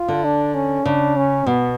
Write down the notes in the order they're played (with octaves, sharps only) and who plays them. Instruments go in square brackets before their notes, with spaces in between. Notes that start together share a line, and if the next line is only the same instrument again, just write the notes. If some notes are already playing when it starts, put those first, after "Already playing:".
Already playing: [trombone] F4
[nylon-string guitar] D3
[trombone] D4
C#4
[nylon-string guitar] C#3 [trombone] D4
[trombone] C#4
[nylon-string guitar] B2 [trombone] B3